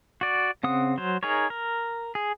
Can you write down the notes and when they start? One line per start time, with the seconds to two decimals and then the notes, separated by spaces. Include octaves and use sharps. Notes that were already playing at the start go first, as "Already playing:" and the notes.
0.21 F#4 D5
0.63 C#3 C4 F#5 D#6
0.98 F#3 C5
1.23 D#4 G#4 A#4 C#5
1.50 A#4
2.15 G#4